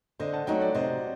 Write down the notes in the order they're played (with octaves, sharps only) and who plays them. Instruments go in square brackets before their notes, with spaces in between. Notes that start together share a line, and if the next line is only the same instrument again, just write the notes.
[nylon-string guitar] D3 [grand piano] C5 D#5
[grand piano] F#5 A5
[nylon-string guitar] F#3 A3 D#4 F#4 [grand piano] D#5 G5
[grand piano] D5 F#5
[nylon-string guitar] C3 [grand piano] C5 D#5